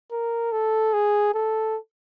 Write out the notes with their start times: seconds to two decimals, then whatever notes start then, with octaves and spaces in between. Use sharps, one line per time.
0.12 A#4
0.52 A4
0.94 G#4
1.34 A4